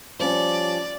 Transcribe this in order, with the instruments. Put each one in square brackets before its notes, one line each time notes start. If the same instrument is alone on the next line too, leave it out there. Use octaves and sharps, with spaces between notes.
[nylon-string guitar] F3 G3 C#4 [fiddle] D5